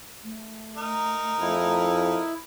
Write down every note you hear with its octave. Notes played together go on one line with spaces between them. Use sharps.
A3
D#4 A#4
F2 E4